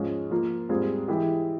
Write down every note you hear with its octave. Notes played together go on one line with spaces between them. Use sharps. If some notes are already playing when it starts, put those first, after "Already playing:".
Already playing: G#2 F3 G#3 C#4
F3 A#3 F4
G#2 G3 C4 F4 G#4
E3 G#3 E4 G4